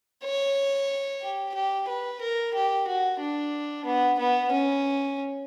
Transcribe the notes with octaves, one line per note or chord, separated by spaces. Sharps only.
C#5
G4
G4
B4
A#4
G4
F#4
D4
B3
B3
C#4